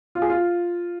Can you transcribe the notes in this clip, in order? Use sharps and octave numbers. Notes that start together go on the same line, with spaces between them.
F4
G#4
F4